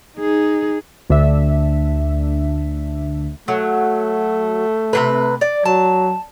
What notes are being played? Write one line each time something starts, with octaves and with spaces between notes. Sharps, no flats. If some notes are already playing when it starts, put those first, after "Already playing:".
D#4 G#4
D2 D4 E5
F#3 A3
C3 D#3 B4
D5
F#3 A5